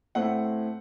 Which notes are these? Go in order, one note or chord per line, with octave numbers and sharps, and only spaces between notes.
A2 A3 C4 F#5